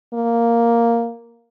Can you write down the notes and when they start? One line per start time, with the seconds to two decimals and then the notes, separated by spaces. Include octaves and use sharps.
0.14 A#3